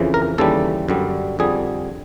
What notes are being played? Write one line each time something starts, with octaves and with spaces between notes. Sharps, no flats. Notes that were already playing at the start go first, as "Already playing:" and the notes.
Already playing: F2 C#3 E3
A#4
D#2 C#3 E3 G3 A4
F#2 D3 G3
F2 D3 G3 G#4